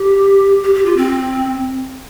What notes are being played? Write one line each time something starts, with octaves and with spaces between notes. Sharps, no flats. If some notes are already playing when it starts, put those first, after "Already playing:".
Already playing: G4
G4
G4
F4
C4